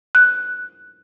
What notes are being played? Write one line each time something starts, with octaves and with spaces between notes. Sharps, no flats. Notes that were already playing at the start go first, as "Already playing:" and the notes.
F#6